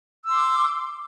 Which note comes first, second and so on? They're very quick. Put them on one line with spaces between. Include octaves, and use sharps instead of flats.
E6 C6 D6